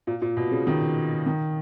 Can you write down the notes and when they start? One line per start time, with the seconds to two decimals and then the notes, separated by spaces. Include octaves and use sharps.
0.07 A#2
0.22 A#2
0.36 B2
0.51 C#3
0.67 D#3
1.26 D#3